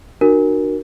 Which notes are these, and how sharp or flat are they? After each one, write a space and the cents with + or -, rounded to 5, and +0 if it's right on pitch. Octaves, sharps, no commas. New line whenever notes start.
D4 +45 F#4 +0 A#4 +0